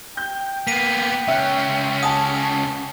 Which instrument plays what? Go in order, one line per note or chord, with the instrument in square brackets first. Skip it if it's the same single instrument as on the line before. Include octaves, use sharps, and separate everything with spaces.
[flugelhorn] G5 [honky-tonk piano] G6
[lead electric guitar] A#3 B3 [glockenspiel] B6 D#7
[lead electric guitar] C#2 C#4 [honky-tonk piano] E5 F#6
[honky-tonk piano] F#5 G#5 A5 [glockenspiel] D#6